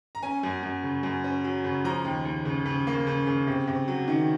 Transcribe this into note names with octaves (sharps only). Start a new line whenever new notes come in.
A#5
C#4 G#5
F#2
F#2
C#3
F#2
C#4
F#3
C#3
F3 A#5
D#2
D#2
C#3
C#3
A#3
C#3
C#3
C3
C3
F#3
D#3